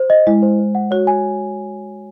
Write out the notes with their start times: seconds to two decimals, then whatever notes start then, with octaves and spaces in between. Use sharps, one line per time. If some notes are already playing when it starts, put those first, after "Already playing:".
Already playing: C5
0.10 D#5
0.27 G#3 E4
0.42 C5
0.59 C5
0.75 F#5
0.91 F#4 C#5
1.07 G#5